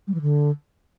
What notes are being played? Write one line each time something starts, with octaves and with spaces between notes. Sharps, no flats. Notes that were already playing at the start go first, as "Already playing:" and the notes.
G3
E3
D3